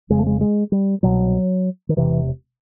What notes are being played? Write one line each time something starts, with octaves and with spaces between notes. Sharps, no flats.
F1 F2 C#3 G#3
A3
G#3
G#3
G3
C2 B2 F#3
D#3
E1 D2 C3 E3